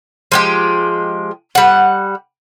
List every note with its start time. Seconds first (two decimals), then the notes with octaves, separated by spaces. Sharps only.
0.32 F3 G#3 G4
1.55 G3 F#5